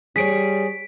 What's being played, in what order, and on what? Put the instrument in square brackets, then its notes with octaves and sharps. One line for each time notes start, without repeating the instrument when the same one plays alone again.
[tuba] G3 [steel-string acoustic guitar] G#4 C#5 [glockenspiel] B6 D7